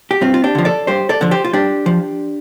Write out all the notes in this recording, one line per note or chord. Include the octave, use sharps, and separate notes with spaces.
G4
G2 C4 F4
F4
D4 G4
D3 F3
A4 D5
G2 G4 C5
A4 D5
D3 F3
G4 C5
F4
G2 D4 G4
F3